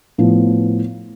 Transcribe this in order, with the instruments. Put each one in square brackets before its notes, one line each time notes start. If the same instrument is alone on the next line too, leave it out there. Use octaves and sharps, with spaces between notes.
[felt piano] A2 F3 B3